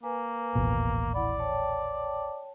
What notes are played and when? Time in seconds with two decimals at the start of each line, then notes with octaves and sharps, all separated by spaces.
0.03 A#3 B4 G#5
0.55 D#1 A1 B2
1.14 E4 D5 F#5 B5
1.39 C#5 G5 A5